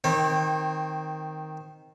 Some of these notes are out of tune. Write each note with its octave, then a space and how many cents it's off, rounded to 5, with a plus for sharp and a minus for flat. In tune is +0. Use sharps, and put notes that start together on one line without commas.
D#3 +0 C4 +0 C#5 -45